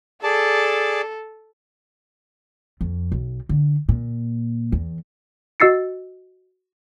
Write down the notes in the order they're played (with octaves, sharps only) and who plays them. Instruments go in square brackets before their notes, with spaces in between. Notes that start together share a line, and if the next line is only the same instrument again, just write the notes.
[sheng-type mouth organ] G#4 D5 A5 [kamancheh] A4
[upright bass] F2
B1
D3
A#2
E2
[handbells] F#4 D#5 E6 A6 C7 C#7